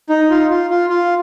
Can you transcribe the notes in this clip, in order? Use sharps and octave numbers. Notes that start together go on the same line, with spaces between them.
D#4
F4
F4
F4
F4